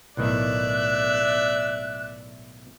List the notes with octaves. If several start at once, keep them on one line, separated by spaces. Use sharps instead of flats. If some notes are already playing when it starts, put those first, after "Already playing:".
B1 A2 D#3 D5 E5 F#6